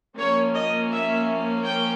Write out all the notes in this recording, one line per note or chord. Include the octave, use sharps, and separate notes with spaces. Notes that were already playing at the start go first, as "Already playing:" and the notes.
F3 A#3 C#4 C#5
D#5
E5
G5